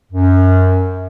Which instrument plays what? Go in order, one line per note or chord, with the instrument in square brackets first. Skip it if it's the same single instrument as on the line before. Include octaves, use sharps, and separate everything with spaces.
[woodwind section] F#2